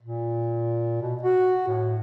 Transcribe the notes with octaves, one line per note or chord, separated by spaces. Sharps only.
A#2
B2
F#4
A2